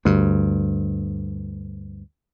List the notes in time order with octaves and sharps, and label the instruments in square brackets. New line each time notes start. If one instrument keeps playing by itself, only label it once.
[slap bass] D2 G2